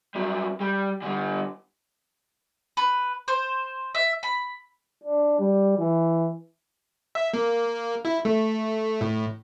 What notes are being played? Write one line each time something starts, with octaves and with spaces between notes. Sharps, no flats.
G2 F#3
G3
D3 G3
B4
C5
E5
B5
D4
G3
E3
E5
A#3
E4
A3
A2